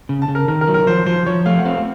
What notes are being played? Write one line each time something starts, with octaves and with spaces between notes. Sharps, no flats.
C#3
A5
C#3
A#4
D#3 A#4
A#4
F#3
A#4
F3 C5
F3 C5
F3 C#5
A3 F5
F#5
C4 F5